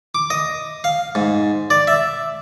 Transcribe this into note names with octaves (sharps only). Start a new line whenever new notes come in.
D6
D#5
F5
G#2
D5
E5